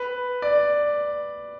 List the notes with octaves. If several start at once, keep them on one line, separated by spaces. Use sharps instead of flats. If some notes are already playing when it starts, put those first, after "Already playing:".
Already playing: B4
D5